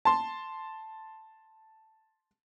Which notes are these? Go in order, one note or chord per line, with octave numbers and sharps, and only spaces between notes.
A5 C6